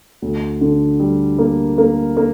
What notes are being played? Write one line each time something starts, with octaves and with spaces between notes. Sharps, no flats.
D2
D3
G3
A#3
A#3
A#3